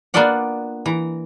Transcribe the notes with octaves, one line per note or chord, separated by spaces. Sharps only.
A#3 B3 D4 F4 D5 F#5
E3 A#5